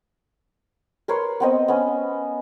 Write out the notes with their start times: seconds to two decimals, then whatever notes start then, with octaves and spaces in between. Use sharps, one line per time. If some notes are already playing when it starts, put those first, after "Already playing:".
1.08 A#4 B4 C#5 C6
1.40 B3 C4 D#5
1.68 B3 C#4